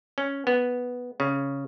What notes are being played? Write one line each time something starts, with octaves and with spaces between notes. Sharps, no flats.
C#4
B3
C#3